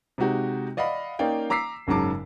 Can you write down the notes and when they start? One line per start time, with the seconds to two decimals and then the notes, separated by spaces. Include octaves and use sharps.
0.18 C3 G#3 D#4 F#4 G4
0.77 D5 D#5 F5 F#5 B5
1.19 A#3 C#4 D#4 D5 F5 G5
1.50 A#5 D6 E6 B6 C7
1.87 F#1 G#2 C#3 F#3 A5 D6